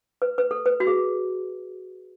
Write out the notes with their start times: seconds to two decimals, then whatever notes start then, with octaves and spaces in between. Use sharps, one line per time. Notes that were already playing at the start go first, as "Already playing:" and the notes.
0.22 B4
0.38 B4
0.51 A4
0.66 B4
0.80 F#4
0.87 G#4